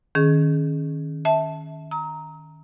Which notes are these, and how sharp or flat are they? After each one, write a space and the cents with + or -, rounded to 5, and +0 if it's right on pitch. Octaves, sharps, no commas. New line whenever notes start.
D#3 -5 C#4 -5 G#4 +20
E5 -20 A5 +0
A#5 +0 D#6 +45